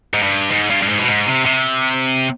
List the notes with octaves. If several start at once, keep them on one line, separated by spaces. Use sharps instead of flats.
G#2
G2
G#2
G2
G2
G#2
B2
G#2
C3
C3